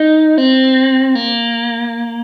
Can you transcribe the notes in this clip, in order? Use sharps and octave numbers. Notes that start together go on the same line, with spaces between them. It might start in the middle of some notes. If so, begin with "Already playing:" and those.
Already playing: D#4
C4
A#3